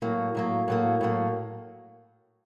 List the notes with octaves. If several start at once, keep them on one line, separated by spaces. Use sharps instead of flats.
A2 F#3 A#3
A2 F#3 A#3
A2 F#3 A#3
A2 F#3 A#3